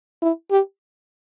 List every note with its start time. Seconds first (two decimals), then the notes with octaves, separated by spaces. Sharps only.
0.22 E4
0.51 G4